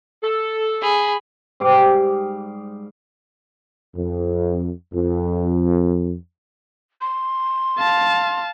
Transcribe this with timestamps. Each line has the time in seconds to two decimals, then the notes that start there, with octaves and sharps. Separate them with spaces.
0.23 A4
0.82 G#4 B5
1.60 G#2 G3 F5 D6
3.96 F2
4.94 F2
7.01 C6
7.79 F5 A5